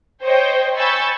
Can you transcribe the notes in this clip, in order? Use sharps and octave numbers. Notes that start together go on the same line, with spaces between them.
C5 C#5 D#5 G5
G#5 B5 C#6 E6 G6 A6